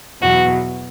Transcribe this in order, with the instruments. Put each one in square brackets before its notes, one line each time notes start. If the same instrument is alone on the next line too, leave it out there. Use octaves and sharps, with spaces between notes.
[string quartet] E2 B2 F#3 F#4